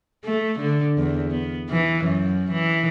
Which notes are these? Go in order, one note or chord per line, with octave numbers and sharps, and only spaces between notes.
A3
D3
E2
B3
E3
F#2
E3